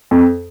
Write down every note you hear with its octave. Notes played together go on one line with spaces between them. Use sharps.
F2